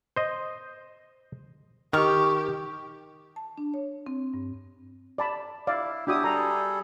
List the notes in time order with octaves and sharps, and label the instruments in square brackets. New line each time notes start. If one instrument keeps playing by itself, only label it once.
[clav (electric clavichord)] C5 D#5
[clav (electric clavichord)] D#3 [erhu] G4 [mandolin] C#6 F6
[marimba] A5
D4
C#5
C4
G2
[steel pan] D5 A5 B5
[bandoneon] E4 [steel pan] D5 F5
[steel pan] D4 F#4 D#6 [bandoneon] E4 G4
[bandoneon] G3 G#4 A4 [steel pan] A#5